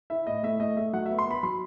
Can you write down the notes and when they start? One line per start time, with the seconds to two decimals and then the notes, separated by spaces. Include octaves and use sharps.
0.10 E4 E5
0.27 A2 D#5
0.43 A3 E5
0.60 A3 D#5
0.77 A3 E5
0.93 F#3 F#5
1.06 B3 E5
1.19 C6
1.27 B3 B5
1.43 F#3 C6